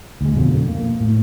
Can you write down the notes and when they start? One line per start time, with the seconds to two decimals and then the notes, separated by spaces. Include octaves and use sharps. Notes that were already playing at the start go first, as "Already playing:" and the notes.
0.21 D2 G#3
0.36 F2 B2 D3 F3
0.69 A#3
1.01 A2